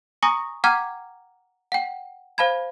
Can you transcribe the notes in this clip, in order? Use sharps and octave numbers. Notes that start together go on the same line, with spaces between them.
G#5 A#5 C#6 D#6 A#6
F#5 G5 A#5 D6 F6 G#6
F#5 G5
C5 F5 A5 B5 G#6